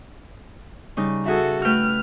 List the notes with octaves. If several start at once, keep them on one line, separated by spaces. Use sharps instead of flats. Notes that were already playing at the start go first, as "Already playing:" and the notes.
C#3 G3 D#4
F#4 G#4 A4 E5
A3 B4 G5 F6